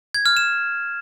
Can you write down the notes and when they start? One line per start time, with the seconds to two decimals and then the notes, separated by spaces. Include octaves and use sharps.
0.14 G#6
0.26 F6
0.37 E7